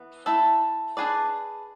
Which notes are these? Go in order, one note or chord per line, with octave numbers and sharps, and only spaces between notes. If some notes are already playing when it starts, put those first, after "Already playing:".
Already playing: E3 B3
A3 E4 A4
D4 G#4 B4 D5